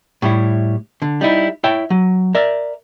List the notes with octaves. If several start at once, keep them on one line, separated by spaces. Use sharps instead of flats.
A2 G3 E4
D3
G3 D#4 E4
E4 C#5 E5 G5
F#3
A#4 D5 E5